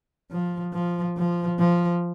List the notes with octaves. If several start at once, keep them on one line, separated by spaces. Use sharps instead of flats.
F3
F3
F3
F3